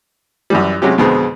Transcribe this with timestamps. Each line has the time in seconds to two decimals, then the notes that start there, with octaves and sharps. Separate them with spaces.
0.50 F#2 E3 G3
0.82 C3 F#3 G#3 C#4 G4
0.98 F2 B2 D3 G#3 C4